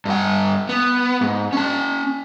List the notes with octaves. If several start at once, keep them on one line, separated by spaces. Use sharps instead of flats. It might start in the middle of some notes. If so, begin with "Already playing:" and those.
G2 F#5
B3
G#2
C#4 A5